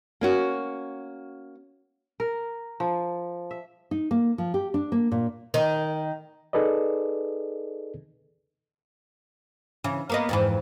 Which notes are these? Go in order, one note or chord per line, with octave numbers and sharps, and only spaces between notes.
A#3 C#4 F#4
A#4
F3
E5
D#4
A#3
F3
G4
D4
A#3
A#2
D#3
D#4 G#4 A4 B4 D5 D#5
C#3 E3
A#3 B3 D#5
F2 G#2 E3